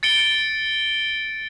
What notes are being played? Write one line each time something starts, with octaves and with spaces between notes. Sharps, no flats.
A6 C#7 D7 G7